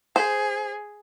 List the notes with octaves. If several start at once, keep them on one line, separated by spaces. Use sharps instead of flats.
G#4 C5